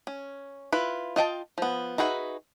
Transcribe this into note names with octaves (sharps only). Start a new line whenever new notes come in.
C#4
E4 F4 B4
F4 D#5 G5 A5
F3 B3
D#4 F#4 G#4 B4 E5